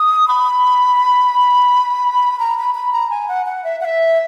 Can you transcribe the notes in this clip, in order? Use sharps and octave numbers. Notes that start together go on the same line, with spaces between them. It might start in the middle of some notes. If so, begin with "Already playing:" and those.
Already playing: D#6
B5
A#5
B5
B5
A#5
G#5
F#5
F#5
E5
F#5
E5